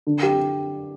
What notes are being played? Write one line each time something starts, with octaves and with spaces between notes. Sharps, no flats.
D3
G4